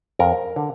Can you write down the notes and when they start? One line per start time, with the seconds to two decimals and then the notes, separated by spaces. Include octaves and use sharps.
0.19 F2 A#4
0.56 D3